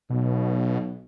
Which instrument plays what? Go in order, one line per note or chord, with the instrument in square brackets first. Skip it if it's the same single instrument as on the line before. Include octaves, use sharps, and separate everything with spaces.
[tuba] B1 [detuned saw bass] B2